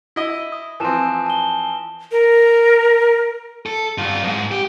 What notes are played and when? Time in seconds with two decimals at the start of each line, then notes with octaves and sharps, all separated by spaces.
0.16 E4 D#5
0.52 D#6
0.80 E3 F3 C4 G#5 A5 E7
1.26 A5 G7
2.12 A#4
3.66 A4
3.98 G2 F4
4.24 F2 G#2
4.51 G4